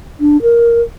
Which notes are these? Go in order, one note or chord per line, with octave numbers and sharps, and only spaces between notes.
D4
A#4